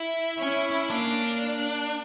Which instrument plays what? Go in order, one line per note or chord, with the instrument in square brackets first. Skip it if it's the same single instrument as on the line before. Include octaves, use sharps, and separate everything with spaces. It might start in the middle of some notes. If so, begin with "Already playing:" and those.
Already playing: [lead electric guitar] E4
[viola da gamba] C#4
[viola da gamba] A#3 [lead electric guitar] D4